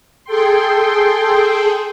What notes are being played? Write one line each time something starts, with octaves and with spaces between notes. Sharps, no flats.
G#4 A4 G5 C6